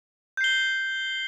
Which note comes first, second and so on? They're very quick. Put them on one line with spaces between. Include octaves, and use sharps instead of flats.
G6 C7 G7